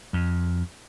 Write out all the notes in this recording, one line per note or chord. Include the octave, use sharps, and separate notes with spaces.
F2